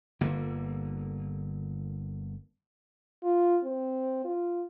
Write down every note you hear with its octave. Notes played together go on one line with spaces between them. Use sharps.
G1 D3 A#3
F4
C4
F4